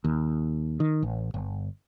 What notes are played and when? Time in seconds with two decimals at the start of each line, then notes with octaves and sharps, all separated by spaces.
0.04 D#2
0.80 D#3
1.03 A1
1.34 G1